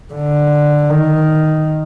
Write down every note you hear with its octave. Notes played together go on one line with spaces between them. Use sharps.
D3
D#3